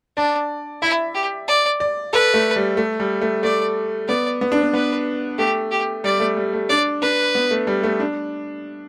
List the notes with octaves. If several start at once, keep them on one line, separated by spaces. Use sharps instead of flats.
D4 D5
E4 E5
G4
D5
D5
A4 B4
A3
G3
A3
G3
A3
A3 D5
B3 D5
B3
D4
B3
B3 B4
A3 G4
G4
G3 D5
A3
G3
A3
D4 D5
D4 B4
B3
A3
G3
A3
D4